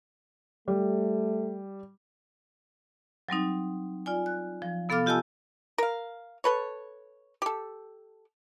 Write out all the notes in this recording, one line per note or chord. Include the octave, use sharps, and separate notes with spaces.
G3 A3
F#3 G3 C4 D#4
F4 D5 G#5
F#6
F3
C3 B3 A4 F5 D6 F6
F4 G4 D#5 G#5 A5 E6
A#4 F5
A4 B4 C#5
G4 A4